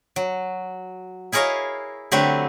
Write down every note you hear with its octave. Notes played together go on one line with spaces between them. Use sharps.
F#3
E4 G#4 A#4 C#5 D#5 F5
D3 F#3 A3 C4 G4 B4